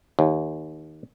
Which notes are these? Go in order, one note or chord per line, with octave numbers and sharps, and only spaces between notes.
D#2